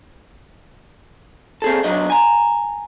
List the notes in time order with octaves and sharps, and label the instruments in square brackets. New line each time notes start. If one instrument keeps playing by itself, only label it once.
[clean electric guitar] C4 G#4 A4
B1 F#3 D4 D#5
G#5 A#5